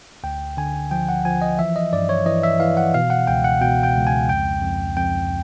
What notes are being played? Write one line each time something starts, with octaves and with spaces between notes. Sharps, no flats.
D2 G5
D3 G#5
F3 G5
F#5
F3 G#5
D#5
E3 E5
D#5
G2 D5
C#5
E3 D#5
E5
E3 F5
F#5
B2 F5
F#5
C#2 G5
F#5
B2 G5
G5
C#2
G#5
F2 G5
F2
F2 G5